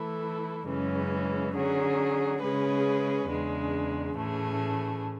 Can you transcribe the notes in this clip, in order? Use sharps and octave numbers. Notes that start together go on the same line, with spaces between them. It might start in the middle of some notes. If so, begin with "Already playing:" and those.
Already playing: E3 A3 E4 A4
F#2 C#3 E3 G#3 C#4
D3 F#3 C#4 G#4
C#3 G#3 C#4 G#4 B4
E2 C#3 G#3 D4
A2 E3 A3 C#4 G#4